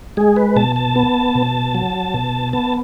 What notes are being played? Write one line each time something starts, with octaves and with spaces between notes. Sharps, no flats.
G#3 G#4
B4
B2 A5
A5
B3
B2
F#3
B2
B3 A5